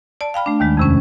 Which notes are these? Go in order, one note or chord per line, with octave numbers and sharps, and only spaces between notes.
D5 A5
F5 G5 B5 F6
A3 D4
D#2 D#3 G#3
F2 C3 C#4